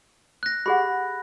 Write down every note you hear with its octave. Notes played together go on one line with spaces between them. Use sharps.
F#6 A#6
G4 G#4 F#5 B5